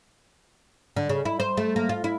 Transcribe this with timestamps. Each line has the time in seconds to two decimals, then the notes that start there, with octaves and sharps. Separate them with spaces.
0.96 D3
1.09 C#3
1.25 E4
1.40 C5
1.57 A3
1.76 A#3
1.89 F4
2.04 E4